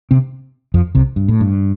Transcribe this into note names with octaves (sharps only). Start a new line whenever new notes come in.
C3 C4
F2 F3
C2 C3
G2
A2
G2